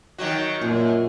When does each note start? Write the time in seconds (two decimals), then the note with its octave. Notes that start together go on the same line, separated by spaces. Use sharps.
0.18 D#3 F#3 F#4
0.61 F#2 A#2